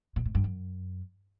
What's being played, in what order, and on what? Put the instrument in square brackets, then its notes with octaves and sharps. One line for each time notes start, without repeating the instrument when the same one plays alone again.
[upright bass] A#2
A2
G2
F#2